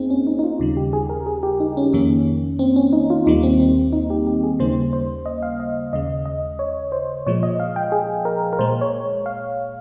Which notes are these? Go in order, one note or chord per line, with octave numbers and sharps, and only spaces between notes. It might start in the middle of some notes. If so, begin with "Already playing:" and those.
Already playing: F2 A#3 C4 D#4 G#4
C#4
D#4
D#4
F4
D#2 C#3 G3
G4
G#4
A#4
G#4
G4
D#4
C#4
F2 D#3 A#3 C#4
C4
C#4
D#4
F4
D#2 D#3 G3 A#3 D#4
C4
C4
D#4
G4
G4
G#4
D#2 C#3 G3 A#3 C5
C5
D#5
F5
D#5
D#2 C#3 G#3 D#5
D#5
C#5
C5
A#2 F3 G#3 C#5
D#5
F5
G5
G#4
A#4
A#4
A#2 G#3 C5
C#5
F5